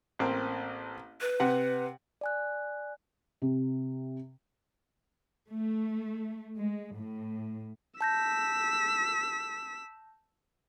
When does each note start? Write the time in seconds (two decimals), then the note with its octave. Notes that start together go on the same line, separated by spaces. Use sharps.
0.19 A1 A#3 C4
1.21 B4
1.40 C3 F#5
2.21 D5 G#5 F#6
3.42 C3
5.49 A3
6.58 G#3
6.96 A2
8.01 A5 E6 G6 A#6 B6